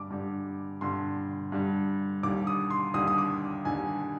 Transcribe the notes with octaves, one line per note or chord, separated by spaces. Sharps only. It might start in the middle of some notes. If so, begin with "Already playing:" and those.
Already playing: G2 D3 G3 D6
G2 D3 G3
G2 D3 G3 C6
G2 D3 G3
D#2 D3 G3 D6
D#6
C6
D#2 D3 G3 D#6
D#6
D6
D#2 D3 G3 G#5